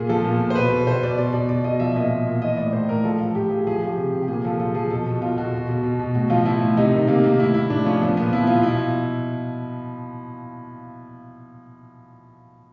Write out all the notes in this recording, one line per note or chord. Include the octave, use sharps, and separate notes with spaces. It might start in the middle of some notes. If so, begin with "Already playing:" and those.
Already playing: A#2 G#4
F3 A4
A#2
A#2
C5
B2 B4
B2
B2 C5
B2 D5
B2 D5
B2 D5
B2 D5
B2 D#5
F3 E5
A#2 D#5
A#2
A#2
E3 D#5
A2 D5
A2 C5
A2 A#4
F3 A4
F3
A2 G4
F3 G#4
F3 G#4
F3 G4
C3
C3
G4
A#2 G#4
F3 A4
F3 A4
F3 G#4
B2 A4
B2
B2 F4
B2 F#4
B2
B2
B2
B2
A2 F#4
F3 F4
F3 E4
A2
C3 D#4
D#3
C3 A#3
D#3 A#3
A2 E4
A2 E4
A2 D4
F3 C#4
F3 B3
A#2 B3
F3 E4
F3 F4
F4
B2 E4